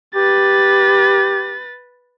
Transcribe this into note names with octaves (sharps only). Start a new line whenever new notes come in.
G4 B4 A6